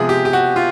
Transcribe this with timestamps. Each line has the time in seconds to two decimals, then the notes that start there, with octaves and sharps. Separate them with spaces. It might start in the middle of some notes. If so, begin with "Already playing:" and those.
Already playing: C3 F3 G#3 B3 G#4
0.09 G4
0.25 G4
0.33 F#4
0.56 F4